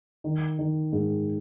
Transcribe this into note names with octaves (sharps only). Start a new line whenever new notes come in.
D#3
D#3
G#2